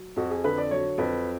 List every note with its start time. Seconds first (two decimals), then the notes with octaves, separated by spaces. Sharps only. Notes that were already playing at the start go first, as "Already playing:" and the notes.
Already playing: F#3
0.16 F2 F#4
0.31 G#4
0.44 D3 B4
0.58 D5
0.71 F#3 C#5
0.98 F2 B4